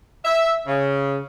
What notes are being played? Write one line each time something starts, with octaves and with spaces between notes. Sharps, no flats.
E5
C#3